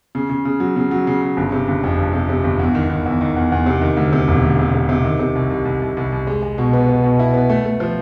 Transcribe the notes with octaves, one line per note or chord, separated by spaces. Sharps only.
C#3
C#3
C#3
F#3
C#3
F#3
C#3
C#3
G1
C3
G1
F2
G1
C3
C3
G1
E2
D#3
D#3
E2
D#3
E2
E2
C3
D#3
D2
C3
E1
D2
C3
C3
C3
D#3
C3
C2
C2
C2
C2
C2
C2
G#3
G#3
B2
B3
B3
B2
E4
B3
A3
A3
F3